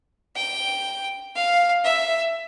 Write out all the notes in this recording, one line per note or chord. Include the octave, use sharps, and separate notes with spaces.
G5
F5
E5